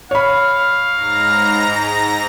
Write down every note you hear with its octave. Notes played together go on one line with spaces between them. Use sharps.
C#5 F5 B5
G#2 A#5 A#6